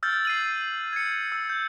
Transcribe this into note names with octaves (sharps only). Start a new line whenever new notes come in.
E6 F6 G6 A6
C7 D#7 F#7
G#6 C#7
E6
G6